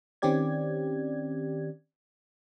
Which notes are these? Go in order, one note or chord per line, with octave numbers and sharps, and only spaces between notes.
D#3 C4 C#4 G4 D5 G#6